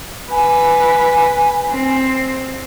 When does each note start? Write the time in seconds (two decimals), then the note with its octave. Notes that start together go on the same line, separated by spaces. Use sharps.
0.31 B4 G#5
1.69 C4